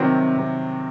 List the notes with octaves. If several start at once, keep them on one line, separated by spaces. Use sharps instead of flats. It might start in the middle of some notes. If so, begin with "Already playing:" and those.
Already playing: C3 D#3 F#3 C4
C3